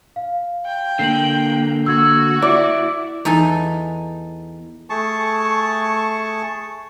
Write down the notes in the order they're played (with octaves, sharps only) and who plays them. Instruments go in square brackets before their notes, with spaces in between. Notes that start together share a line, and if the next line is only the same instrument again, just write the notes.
[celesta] F5
[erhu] G5
[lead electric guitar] D3 A#3 [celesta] C7 F#7
[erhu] F#4 [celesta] E6 G#6
[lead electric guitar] E4 [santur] D5
[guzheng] E2 D#4 A4 G#5
[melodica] A3 G#4 A5 C#6